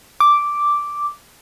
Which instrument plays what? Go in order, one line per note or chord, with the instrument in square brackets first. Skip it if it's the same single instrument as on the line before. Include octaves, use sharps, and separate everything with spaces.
[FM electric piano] D6